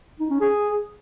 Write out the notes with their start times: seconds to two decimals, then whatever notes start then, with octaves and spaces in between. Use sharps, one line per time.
0.20 D#4
0.30 C#4
0.41 G#4